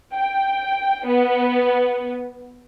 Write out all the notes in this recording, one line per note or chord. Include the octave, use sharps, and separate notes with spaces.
G5
B3